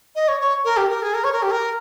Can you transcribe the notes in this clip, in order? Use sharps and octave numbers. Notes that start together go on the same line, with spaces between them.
D#5
C#5
C#5
A#4
G4
A#4
G#4
A#4
C#5
A#4
G4
A#4